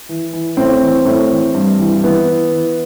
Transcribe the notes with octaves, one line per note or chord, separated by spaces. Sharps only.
E3
E3
A2 C4
E3
A2
E3
G2
E3
E3 B3
E3
E3